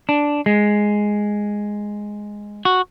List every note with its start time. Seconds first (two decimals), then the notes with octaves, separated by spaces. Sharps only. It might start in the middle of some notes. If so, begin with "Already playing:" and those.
0.09 D4
0.46 G#3
2.65 F#4